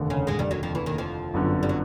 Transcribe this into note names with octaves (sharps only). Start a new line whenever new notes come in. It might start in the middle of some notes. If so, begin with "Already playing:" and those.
Already playing: F1 D#2 D3
C#3 C#4
G#2 G#3
G2 G3
F#2 F#3
F2 F3
E2 E3
D#2 D#3
F2 F3
G1 F#2 D3
G3
F#3